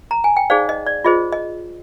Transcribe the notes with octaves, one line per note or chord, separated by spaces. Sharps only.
A#5
G#5
G5
D#4 G#4 C5 D5 F5
D#5
D5
F4 G#4 C5 D#5
D#5